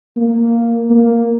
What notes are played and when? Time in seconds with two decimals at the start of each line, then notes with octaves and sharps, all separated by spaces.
0.17 A#3
0.90 A#3